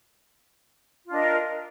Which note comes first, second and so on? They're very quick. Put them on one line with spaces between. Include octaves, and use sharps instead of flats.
F4 D4 D#5 A#4